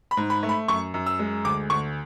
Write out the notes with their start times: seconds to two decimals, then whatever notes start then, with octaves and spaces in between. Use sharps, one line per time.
0.11 B5
0.17 G#2
0.30 B5
0.43 A3
0.49 B5
0.68 F#2 C#6
0.94 F#2
1.06 E6
1.19 G#3
1.45 D2 D6
1.70 D2 C#6